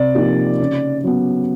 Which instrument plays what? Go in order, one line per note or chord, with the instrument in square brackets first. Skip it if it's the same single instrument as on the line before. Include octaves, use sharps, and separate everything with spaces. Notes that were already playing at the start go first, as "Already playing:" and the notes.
Already playing: [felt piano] C3 [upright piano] D5
[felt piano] F3 A#3 D#4 G4
C#3
F#3 B3